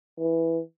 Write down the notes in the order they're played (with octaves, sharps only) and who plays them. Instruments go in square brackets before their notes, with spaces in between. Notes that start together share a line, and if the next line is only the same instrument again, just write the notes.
[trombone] E3